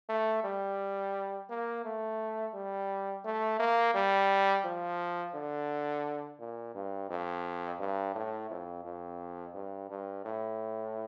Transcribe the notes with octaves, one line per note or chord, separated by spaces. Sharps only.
A3
G3
A#3
A3
G3
A3
A#3
G3
F3
D3
A#2
G2
F2
G2
A2
F2
F2
G2
G2
A2